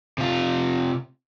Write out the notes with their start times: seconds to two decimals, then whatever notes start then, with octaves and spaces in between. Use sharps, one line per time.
0.18 C3 F4